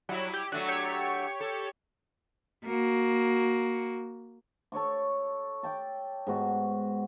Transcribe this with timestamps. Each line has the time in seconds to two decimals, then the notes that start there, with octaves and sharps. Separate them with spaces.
0.09 F#3 G3 E4
0.33 G4
0.52 F#3 A3 D4 F#4 D#7
0.68 G4 C#5 C#6
1.40 A4
2.66 A#3 F#4
4.72 A4 C#5 C#6 D6
5.63 A4 G5 D6
6.27 G#2 B3 F#4